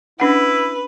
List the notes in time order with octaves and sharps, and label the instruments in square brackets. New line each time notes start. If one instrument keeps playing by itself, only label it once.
[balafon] C#4 D4 F#5 [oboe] E4 [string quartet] B4